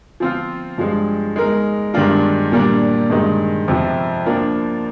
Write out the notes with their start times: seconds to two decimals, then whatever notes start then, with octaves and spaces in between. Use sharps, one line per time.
0.20 F3 C4 F4
0.78 G2 F3 G#3
1.36 G#3 D#4 A#4
1.94 G2 D#3 G#3 D4 F4
2.52 A#2 G3 A#3 D4
3.10 G2 D#3 G#3 D#4
3.68 F2 C3 F3
4.26 F3 A#3 D4